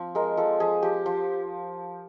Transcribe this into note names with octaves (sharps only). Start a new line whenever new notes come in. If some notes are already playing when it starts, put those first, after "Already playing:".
Already playing: F3 C4
G#3 A#4
F3 A4
F3 G#4
F3 G4
F3